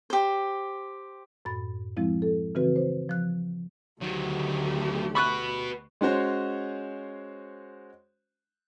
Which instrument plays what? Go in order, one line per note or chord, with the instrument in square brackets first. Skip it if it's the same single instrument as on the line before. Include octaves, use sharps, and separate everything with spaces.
[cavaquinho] G4 C5
[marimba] F#2 A2 B5 A6
F3 G#3 C4 E4
A4
C#3 E3 C4 F#4 B4
C5
F3 F#6
[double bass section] D2 [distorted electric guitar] D#3 F#3 [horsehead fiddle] A3 G4
[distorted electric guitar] F#4 B4 [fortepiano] B5 C#6 F#6
[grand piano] G#3 C#4 F#4 C5 C#5